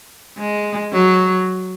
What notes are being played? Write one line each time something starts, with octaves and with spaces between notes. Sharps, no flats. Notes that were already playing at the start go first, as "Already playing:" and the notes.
G#3
F#3